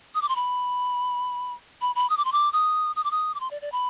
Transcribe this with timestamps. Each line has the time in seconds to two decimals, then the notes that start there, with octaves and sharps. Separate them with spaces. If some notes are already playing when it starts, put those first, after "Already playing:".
0.15 D#6
0.22 D6
0.29 C6
0.36 B5
1.81 B5
1.95 B5
2.10 D#6
2.17 D6
2.25 C6
2.32 D6
2.53 D#6
2.96 D#6
3.04 D6
3.11 D#6
3.34 D6
3.40 C6
3.51 D5
3.62 D5
3.72 B5